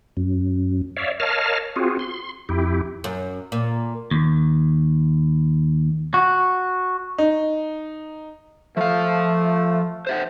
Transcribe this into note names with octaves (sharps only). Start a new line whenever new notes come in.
F#2
C#5 D5 E5 F5
A#4 C#5 D#5 F5 A5 F6
C4 F4 F#4 G#4
C6
F2 E4 G4
F#2
A#2
D#2
F#4
D#4
F3 A3 F5
C5 E5 F#5